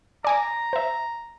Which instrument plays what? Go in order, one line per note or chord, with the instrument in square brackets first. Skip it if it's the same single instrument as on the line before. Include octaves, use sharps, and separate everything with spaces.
[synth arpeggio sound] D5 G#5 D6 [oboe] A#5
[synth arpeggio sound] C5 E5